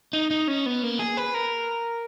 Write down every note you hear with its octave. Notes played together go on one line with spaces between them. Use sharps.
D#4
D#4
C#4
B3
A#3
G#4
B4
A#4